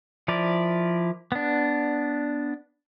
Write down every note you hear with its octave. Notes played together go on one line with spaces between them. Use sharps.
F3 E4 A#4 D5
B3 D4